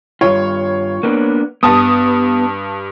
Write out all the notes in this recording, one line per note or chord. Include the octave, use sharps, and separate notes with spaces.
G2 A#2 F4 C#5
A#3 B3 D4
G2 B3 A5 D#6